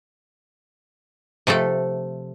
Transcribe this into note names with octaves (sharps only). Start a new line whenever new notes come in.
C3 F3 A3 A4